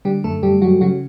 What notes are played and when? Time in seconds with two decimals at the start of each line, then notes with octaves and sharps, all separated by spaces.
0.05 D3 G3 G4
0.24 F#2 A3 A4
0.42 F#2 G3 G4
0.61 F#3 G3 F#4
0.81 C#3 F#3 F#4